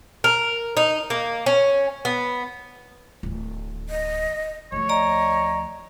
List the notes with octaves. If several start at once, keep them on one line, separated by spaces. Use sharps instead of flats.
A#4
D#4
A#3
C#4
B3
D1 D#3
D#5
D2 F3 C#5
D5 D#5 A#5